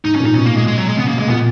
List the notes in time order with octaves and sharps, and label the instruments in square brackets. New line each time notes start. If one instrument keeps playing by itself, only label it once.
[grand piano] G#2 [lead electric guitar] D#4
[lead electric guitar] C#4
[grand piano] A#2
[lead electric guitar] D#4
[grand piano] B2 [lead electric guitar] C#4
[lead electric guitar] A#3
G#3
G#3
F#3
G#3
[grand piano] C#3 [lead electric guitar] B3
[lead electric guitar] A#3
[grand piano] B2
[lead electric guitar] G#3
[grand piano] A#2 [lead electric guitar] B3